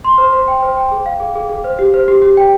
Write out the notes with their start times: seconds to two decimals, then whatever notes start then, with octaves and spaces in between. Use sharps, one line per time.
0.05 C6
0.18 C5
0.33 C5
0.48 G5
0.62 C5
0.77 G5
0.91 G#4
1.06 F5
1.20 G#4
1.35 G#4
1.49 G#4
1.64 C5
1.79 G4
1.94 C5
2.08 G4
2.22 G4
2.37 G5